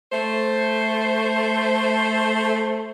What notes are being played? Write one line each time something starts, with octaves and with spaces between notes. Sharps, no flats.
A3 C5